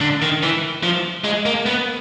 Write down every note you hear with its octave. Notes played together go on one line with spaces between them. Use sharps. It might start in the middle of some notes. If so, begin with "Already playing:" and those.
D3
D#3
E3
F3
G#3
A#3
B3